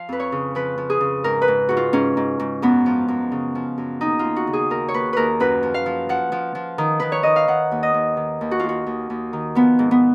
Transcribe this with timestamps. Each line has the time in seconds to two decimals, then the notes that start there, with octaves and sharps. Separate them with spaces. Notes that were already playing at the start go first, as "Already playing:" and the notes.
Already playing: F3 F5
0.09 F2 B4
0.20 C#5
0.32 C#3
0.55 F3 B4
0.78 F3
0.90 G#4
1.01 C#3
1.24 G#2 A#4
1.42 B4
1.48 G#2
1.69 G#2 F#4
1.77 F4
1.93 G#2 C#4
2.17 G#2
2.40 G#2
2.62 F#2 B3
2.86 F3
3.08 F#2
3.32 C#3
3.55 F3
3.78 F#2
4.01 D#2 D#4
4.19 D#2 F4
4.36 F#4
4.47 C#3
4.53 G#4
4.70 D#2 A#4
4.88 C#5
4.94 D#2 B4
5.13 D#2 A#4 B4
5.40 F#2 B4
5.63 F3
5.74 F5
5.86 F3
6.09 F3 F#5
6.32 F3
6.55 F3
6.78 D#3
7.00 D#3 B4
7.12 C#5
7.23 D#3 D#5
7.36 F5
7.48 D#3 F#5
7.72 D#2
7.83 D#5
7.94 D#2
8.17 D#3
8.41 D#2
8.51 F#4
8.59 D#2 F4
8.69 F#4
8.87 D#2
9.10 D#2
9.33 D#3
9.55 F3 B3
9.79 G#2
9.91 B3